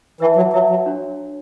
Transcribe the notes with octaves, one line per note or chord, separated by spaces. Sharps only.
E3 B4 E5 A5
F#3
F#3 B4 E5 A5
F#3
D4 F#4 C#5